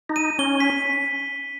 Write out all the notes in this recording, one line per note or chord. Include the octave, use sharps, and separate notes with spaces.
D#4
D#7
C#4 G7
B6